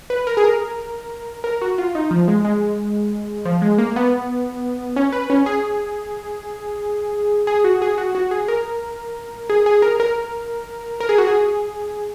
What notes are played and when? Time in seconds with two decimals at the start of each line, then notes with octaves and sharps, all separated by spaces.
0.10 B4
0.27 A#4
0.37 G#4
0.44 A#4
1.44 A#4
1.62 F#4
1.78 F4
1.95 D#4
2.11 F3
2.28 G#3
2.45 G#3
3.45 F3
3.62 G#3
3.78 A#3
3.96 B3
4.96 C#4
5.13 B4
5.30 C#4
5.46 G#4
7.47 G#4
7.64 F#4
7.82 G#4
7.98 F#4
8.15 F#4
8.31 G#4
8.48 A#4
9.50 G#4
9.66 G#4
9.82 A#4
10.00 A#4
11.00 A#4
11.09 G#4
11.18 F#4
11.27 G#4